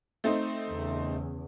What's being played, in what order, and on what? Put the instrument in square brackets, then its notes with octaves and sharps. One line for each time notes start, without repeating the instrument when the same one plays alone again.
[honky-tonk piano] A3 C4 D#4
[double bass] E2 C#3